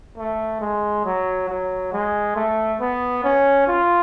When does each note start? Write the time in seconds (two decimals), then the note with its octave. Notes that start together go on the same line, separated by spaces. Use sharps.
0.18 A3
0.61 G#3
1.05 F#3
1.49 F#3
1.93 G#3
2.36 A3
2.80 B3
3.24 C#4
3.67 F4